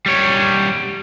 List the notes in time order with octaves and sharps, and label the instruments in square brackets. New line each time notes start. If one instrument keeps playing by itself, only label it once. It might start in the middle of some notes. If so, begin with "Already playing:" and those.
[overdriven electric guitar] G3 C#5